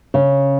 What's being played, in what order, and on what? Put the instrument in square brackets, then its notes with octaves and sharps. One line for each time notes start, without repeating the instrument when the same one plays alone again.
[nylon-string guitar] C#3